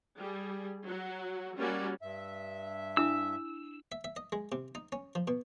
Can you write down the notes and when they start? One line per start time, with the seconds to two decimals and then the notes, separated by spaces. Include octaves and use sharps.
0.17 G3 G#4
0.87 F#3 F#4
1.57 G3 A#3 C#4 F#4 D5
2.02 G2 E5
2.97 D4 E4 D#6 E6
3.92 E5
4.04 E5
4.16 D#5
4.32 G#3
4.52 C3
4.75 D#4
4.92 C#4
5.15 F3
5.28 B2